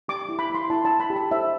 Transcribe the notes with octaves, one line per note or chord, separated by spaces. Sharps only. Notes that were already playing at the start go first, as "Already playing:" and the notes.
G4 D6
E4
B5
E4 C6
E4 A5
A5
E4
B5
G4
A5
C5 E5